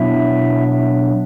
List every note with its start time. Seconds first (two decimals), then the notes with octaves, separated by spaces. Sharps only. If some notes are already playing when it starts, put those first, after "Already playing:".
Already playing: B2 F#3 B3 D4 E4 E5